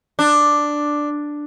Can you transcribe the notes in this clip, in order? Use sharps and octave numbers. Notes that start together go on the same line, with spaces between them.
D4